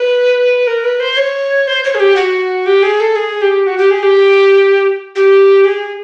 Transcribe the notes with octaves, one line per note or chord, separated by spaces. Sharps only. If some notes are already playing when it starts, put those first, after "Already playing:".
Already playing: B4
A#4
B4
C5
C#5
C5
C#5
G#4
G4
F#4
G4
G#4
A4
G#4
G4
F#4
G4
G#4
G4
G4
G#4